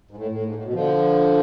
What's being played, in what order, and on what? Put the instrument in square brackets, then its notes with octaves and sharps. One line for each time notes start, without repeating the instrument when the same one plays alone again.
[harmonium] G#2
A2
A2
G#2
A2
B2
D3 F3